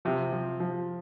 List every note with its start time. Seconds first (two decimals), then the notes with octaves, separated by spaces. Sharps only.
0.05 C3 F3
0.33 F3
0.60 F3